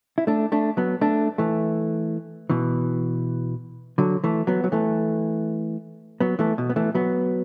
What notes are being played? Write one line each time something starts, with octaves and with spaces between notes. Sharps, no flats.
E4
A3 D4
A3 D4
F#3 B3
A3 D4
E3 A3
B2 E3
D3 F#3
E3 A3
F#3 B3
F#3
E3 A3
F#3 B3
E3 A3
B2
B3
E3 A3
F#3 B3